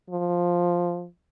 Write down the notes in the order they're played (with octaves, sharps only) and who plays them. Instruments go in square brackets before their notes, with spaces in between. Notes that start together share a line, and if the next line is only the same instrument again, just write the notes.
[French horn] F3